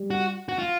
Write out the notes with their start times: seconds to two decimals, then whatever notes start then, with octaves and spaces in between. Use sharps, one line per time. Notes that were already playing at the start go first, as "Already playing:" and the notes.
Already playing: G3
0.11 F#4
0.49 F#4
0.59 F4